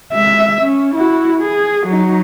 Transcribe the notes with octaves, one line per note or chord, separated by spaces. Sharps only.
G#3 E5
C#4
E4 F#4
G#4
F#3 D#4